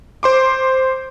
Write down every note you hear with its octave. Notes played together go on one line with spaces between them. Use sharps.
C5 C6 D6